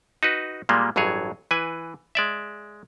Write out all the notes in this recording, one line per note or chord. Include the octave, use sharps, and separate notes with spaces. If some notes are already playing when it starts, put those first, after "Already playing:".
D#4 F#4 B4
A#2 G3 G#3 A#3
A1 G2 F#3 G#4 C#5
E3 B4 G#5
G#3 D5 E5